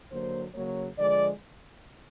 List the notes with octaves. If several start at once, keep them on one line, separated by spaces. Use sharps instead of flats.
D3 F#3 A#3 C5
C#3 F#3 A#3 C#5
D3 F3 G#3 D5